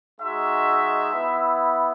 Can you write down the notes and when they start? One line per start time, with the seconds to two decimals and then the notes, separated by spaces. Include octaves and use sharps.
0.21 G#3 D#4 F#4 E5
1.13 B3 E4